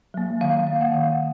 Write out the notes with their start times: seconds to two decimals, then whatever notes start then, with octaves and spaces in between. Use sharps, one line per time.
0.14 F#3 A#3
0.41 D#3 F5
0.67 A#3 F5
0.81 F#5
0.94 D#3 F5